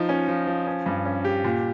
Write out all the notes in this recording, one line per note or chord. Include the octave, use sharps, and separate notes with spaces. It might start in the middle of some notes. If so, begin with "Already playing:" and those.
Already playing: F3 D#4
C#4
F3
F3
C#4
G2
C#4
G4
A#2